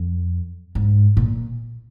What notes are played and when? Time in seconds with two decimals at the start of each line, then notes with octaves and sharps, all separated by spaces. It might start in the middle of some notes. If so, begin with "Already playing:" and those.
Already playing: F2
0.75 G#2
1.17 A#2